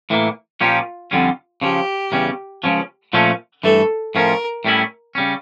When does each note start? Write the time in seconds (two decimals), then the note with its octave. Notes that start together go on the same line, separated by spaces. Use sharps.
0.10 A2 E3 G3 A#3
0.60 A#2 F3 C#4 F4 G4
1.11 F2 D3 G3 C#4 F4
1.62 C#3 F3 C#4 G4
2.12 E2 C#3 G3 C#4
2.64 C#2 C#3 F3 C#4
3.13 A#2 F3 A3 C#4
3.64 G2 E3 A3 A4
4.15 A2 F3 C#4 F4 A#4
4.65 A2 G3 C#4 E4
5.15 C#3 G3 C#4